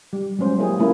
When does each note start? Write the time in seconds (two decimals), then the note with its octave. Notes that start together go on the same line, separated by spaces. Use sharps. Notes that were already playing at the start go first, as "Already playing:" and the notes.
0.13 G3
0.39 F#3 G#3 C#4 C5
0.58 A#3 E4 G4 G#4
0.79 A3 A#3 C#4 E4 F4 A#4